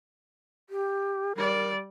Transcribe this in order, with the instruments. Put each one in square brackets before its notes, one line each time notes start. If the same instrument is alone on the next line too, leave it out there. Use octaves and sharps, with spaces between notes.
[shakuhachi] G4
[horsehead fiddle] G3 D5 [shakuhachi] A#4